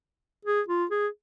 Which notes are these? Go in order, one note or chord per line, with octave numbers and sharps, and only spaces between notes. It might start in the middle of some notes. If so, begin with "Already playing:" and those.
G#4
F4
G#4